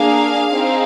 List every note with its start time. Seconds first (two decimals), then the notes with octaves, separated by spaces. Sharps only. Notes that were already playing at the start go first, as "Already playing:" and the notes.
Already playing: A#3 D4 G#4 F5
0.52 C4 D#4 G#4